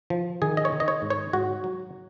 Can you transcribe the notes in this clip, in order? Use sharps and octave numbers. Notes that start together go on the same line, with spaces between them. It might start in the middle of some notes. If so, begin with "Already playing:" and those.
F3
D#3 G#4
D#5
C#5
D#3
D#5
C#5
G#2
C#5
G#2 F#4
F#3